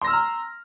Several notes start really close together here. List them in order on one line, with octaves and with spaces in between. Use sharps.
C6 A#6 E6 F6 A#5